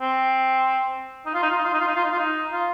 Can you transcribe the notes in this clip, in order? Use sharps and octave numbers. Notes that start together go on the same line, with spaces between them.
C4
D#4
F4
D#4
F4
D#4
F4
D#4
F4
D#4
F4
D#4
F4
D#4
F4